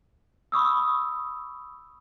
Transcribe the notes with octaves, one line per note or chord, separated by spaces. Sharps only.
B5 C#6 D#6 E6